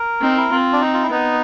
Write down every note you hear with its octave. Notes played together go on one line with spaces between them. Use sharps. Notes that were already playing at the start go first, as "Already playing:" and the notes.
Already playing: A#4
C4 D#4
E4
C4 F4
D4
D#4
F4
E4
B3 D#4